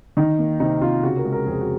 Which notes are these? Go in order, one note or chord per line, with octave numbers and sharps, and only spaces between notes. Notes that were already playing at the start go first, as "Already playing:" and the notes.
D#3 D#4
A#3
C3 D#4
C3 F4
C#3 F#4
A#4
G#3
A#4
F2 G#4
F#4